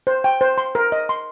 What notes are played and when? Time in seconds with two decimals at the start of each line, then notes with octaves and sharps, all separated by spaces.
0.07 C5
0.24 G5
0.41 C5
0.58 C6
0.75 A#4
0.92 D#5
1.09 C6